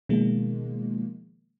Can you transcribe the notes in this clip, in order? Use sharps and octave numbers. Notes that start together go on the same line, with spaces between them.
B2 D#3 F3 G#3 A#3